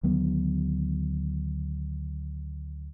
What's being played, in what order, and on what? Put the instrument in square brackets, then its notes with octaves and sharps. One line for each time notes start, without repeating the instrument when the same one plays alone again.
[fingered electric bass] D2 D#3 F#3 B3